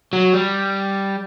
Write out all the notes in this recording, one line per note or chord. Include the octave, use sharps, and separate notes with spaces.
F#3
G3